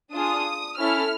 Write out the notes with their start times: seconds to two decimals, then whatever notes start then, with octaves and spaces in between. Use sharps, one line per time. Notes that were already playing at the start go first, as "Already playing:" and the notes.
0.13 D4 F4 G#4 D#6
0.78 C#4 E4 A4 F6